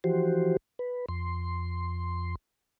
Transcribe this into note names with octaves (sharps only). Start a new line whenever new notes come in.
E3 F3 F#4 G4 C5
B4
F2 C6